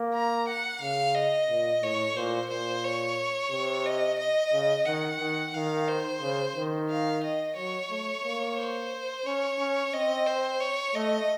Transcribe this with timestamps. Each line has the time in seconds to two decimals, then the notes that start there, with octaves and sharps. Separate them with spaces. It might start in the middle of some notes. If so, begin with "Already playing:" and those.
Already playing: A#3
0.14 A#5
0.48 F#5
0.81 C#3 F5
1.15 D#5
1.50 A#2
1.83 A2 C#5
2.16 A#2 C5
2.50 A#2 C5
2.84 C#5
3.51 C3
3.86 D#5
4.19 D#5
4.53 C#3
4.86 D#3 F#5
5.20 D#3
5.54 D#3 F5
5.88 C5
6.22 C#3
6.56 D#3
6.90 F5
7.23 D#5
7.57 F#3 C#5
7.90 A3
8.24 A#3
8.58 C5
9.26 C#4 C#5
9.59 C#4
9.93 C4 D#5
10.27 C5
10.61 C#5
10.95 A3 D#5